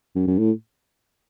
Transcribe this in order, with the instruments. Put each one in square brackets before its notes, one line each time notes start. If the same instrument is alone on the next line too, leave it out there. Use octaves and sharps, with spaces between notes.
[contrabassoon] F#2
F#2
A2